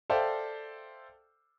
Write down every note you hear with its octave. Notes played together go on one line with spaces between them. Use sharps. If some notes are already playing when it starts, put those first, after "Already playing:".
A4 C5 D5 E5 F5 G5